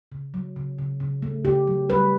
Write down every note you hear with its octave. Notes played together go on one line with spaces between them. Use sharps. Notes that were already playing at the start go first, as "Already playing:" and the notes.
C#3
F#3
C#3
C#3
C#3
A3
C#3 G4
F#3
G3 B4